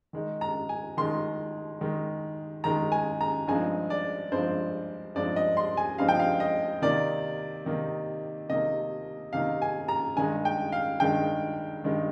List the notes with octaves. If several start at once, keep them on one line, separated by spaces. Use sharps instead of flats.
D#3 G#3 D#4
A#5
G#5
D#3 G#3 D#4 C6
D#3 G#3 D#4
D#3 G#3 D#4 A#5
G#5
A#5
G2 F3 G#3 C4 D#4 G#5
D5
G2 F3 G#3 C4 D#4 C5
G2 F3 G#3 C4 D#4 D5
D#5
C6
G#5
G2 F3 G#3 C4 D#4 F5
G5
F5
D#5
C3 D#3 A#3 D#4 D5
C3 D#3 A#3 D#4
C3 D#3 A#3 D#4 D#5
C3 D#3 A#3 D#4 F5
G#5
A#5
G2 D#3 G#3 D#4 G#5
G5
F5
G2 D#3 G#3 D#4 G5
G2 D#3 G#3 D#4